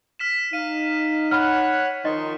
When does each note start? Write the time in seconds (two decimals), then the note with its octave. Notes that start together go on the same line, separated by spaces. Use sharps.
0.19 F6 B6 E7
0.53 D#4 F5 D#7
1.31 C#5 F#5 B5 F6 F#6
2.05 D#3 F3 D#4 D#5 C6 C#6